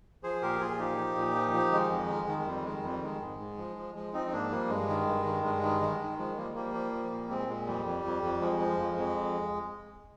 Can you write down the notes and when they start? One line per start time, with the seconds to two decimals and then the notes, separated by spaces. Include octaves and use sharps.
0.23 F3 G#4 C5
0.42 A#2 G4 A#4
0.61 A#2 F4 G#4
0.79 F3 D#4 G4
0.98 F3
1.17 A#2
1.35 F3
1.54 F3
1.72 D#3 G#3
1.91 F2
2.09 D#3
2.28 D#3
2.38 G#3
2.46 F2 G3
2.65 D#3 G#3
2.84 F2 G3
3.02 D#3 G#3
3.21 G#2
3.40 G#2
3.58 F3
3.77 F3
3.95 F3 G#3
4.14 F3 C4 D#4
4.27 D#4
4.32 G#2 A#3 D4
4.51 F3 G3 A#3
4.69 G2 G#3
4.88 D#3
5.07 G2
5.25 D#3
5.44 G2 G#3
5.62 D#3
5.81 D#3
6.00 D#3
6.18 F3 G#3
6.37 F3 G3 A#3
6.55 F3 G3 A#3
6.74 F3
6.92 F3
7.11 A#2
7.30 A#2 G#3 C4
7.48 A#2 G#3
7.67 F2 G3
7.85 F2
8.04 F2
8.23 F2
8.41 F3 G#3
8.60 F3
8.79 F2
8.97 F2